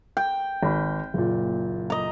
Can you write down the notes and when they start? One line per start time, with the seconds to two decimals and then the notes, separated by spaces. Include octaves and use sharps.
0.17 G5
0.63 G#1 B5
1.14 F#1 A#2
1.90 D#5 A#5